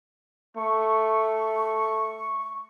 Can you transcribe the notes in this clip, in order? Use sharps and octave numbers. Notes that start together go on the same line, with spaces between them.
A3 C#6